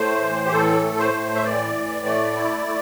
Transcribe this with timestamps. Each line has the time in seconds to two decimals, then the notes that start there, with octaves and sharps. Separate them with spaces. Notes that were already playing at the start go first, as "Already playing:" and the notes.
Already playing: A2 A3 C5
0.22 E3
0.45 G4
0.52 A2 A4
0.84 A3
0.99 C5
1.14 A2
1.35 E5
1.44 E3 D5
1.75 A2
2.06 A3
2.36 E4
2.67 A3